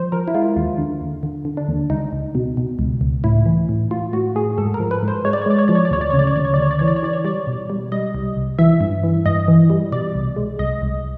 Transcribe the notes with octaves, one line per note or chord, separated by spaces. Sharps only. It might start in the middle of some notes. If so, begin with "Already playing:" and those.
Already playing: F3 C5
F3 A#4
E4
G#3 F4
D#2 F4
D3
D#2
D3
D3
D4
D#2
C#2 D#4
C#2
B2
B2
C#2
C#2
A2 E4
E3
A2
A2 F4
A2 F#4
A2 G#4
G#2 A4
A#4
F3
B4
G#2
C5
G#3 C#5
D5
C#5
G#3 D5
C#5
F3 D5
C#5
D5
D2 C#5
D5
C#3 C#5
D5
C#5
D2 D5
C#5
D5
D2 C#5
D5
E3 C#5
D5
C#5
E3 D5
C#5
G3 D5
B2
G3
G3 D#5
C2
C2
E3 E5
G2
E3
G2 D#5
E3
G3
B2 D5
C2
G#3
C2 D#5
C2